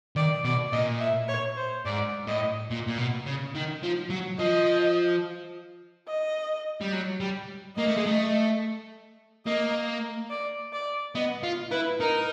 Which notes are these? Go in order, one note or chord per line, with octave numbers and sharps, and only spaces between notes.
D#3 D5
B2 D5
A#2 D#5
E5
C#5
C5
G#2 D5
A2 D#5
A#2
A#2
B2
C#3
D#3
F3
F#3
F3 D#5
D#5
G3
F#3
G3
A#3 D#5
A3
G#3
A3
A#3 D#5
D5
D5
B3 D#5
F4
E4 B4
D#4 A#4